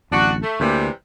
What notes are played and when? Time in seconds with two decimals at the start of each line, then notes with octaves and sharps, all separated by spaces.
0.11 D1 A1 D4 F#4
0.43 A3
0.60 D2 C3 E3 G3 A#3